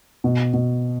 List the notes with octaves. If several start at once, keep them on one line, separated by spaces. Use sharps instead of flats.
B2
B2